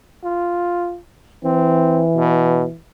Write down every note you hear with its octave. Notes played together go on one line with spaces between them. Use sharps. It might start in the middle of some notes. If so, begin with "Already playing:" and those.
F4
E3 C4
B2